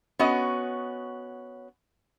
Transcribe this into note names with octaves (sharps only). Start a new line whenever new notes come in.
B3 C#4 F#4 D#5